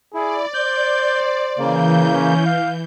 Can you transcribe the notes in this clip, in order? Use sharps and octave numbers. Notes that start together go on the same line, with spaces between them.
E4 G#4 D5
C5 G6
C#3 E3 A#3 G6
C#4
F5